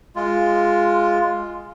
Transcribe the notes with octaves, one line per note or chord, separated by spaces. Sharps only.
G#3 F4